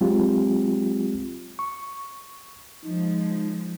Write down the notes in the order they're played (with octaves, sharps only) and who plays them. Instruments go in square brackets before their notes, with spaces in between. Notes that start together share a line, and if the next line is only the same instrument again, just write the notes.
[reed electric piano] F#3 G#3 C4 F4 G4
C#6
[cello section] F3 G#3 [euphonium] D#4